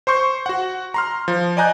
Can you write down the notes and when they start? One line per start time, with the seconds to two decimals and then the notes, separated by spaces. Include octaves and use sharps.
0.07 C5 C6 C#6 G6
0.46 F#4 F#5
0.94 A#5 C6 F6
1.28 F3
1.57 D5 D#5 G#5 A#5 F#6 G6